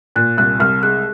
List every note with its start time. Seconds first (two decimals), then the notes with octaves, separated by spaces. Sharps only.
0.16 A#2 F#6
0.37 C2 F#6
0.60 C2 F6
0.83 G#3 F#6